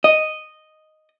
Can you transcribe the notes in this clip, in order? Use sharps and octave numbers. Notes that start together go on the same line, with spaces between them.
D#5